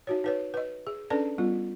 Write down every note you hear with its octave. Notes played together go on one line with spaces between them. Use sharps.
D#4 F#4 C#5
D#4 B4 C#5
B4 D#5
G#4
C#4 D4 A4 B4 D5 A5
G3 B3 F4